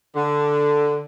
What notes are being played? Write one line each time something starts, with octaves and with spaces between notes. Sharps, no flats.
D3